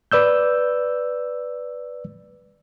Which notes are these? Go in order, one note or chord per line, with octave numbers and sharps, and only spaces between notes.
B4 D5 E6 G6